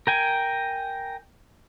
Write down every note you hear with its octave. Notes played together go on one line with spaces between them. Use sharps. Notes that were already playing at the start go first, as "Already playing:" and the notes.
A#4 G5 G#5